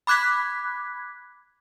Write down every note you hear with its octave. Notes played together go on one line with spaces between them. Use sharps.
B5 D6 F#6 G#6 B6